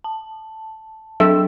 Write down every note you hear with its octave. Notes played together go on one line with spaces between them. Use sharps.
A5
F#3 D4 A4 E5 G5